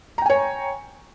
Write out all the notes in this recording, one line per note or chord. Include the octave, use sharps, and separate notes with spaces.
C#5 G5 G#5 A#5